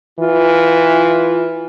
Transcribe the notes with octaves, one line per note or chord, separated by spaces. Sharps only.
E3 F4